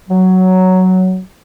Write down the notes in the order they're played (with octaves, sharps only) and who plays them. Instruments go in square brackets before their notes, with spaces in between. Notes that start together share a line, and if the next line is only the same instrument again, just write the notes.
[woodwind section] F#3